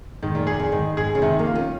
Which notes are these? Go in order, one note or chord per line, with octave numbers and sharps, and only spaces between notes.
G#2 D#3
A#2
A#2 G#4
A#2
G#2 D#3
G#2 G#4
C#3
C3 D#3
A#3
F4
C#4